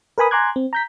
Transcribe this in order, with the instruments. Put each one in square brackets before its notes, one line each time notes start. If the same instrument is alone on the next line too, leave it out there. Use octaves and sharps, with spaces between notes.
[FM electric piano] A#4 B4 G#5 B5 D#6
G#5 A#5 C6 D6 F#6 G#6
C4
A#5 G6 B6